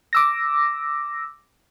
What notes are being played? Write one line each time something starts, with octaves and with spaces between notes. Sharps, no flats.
D6 E6 A#6